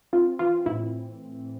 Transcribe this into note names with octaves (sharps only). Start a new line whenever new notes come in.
C4 F4
E3 F4
A2 E4